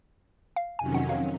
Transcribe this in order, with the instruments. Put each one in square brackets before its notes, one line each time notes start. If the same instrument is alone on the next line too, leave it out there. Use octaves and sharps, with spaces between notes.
[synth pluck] F5
[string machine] F2 C3 D#3 F#3 C#4 [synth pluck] G#5
[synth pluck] F#5
F5